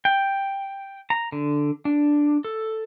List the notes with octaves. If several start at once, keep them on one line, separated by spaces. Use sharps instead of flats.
G5
A#5
D3
D4
A4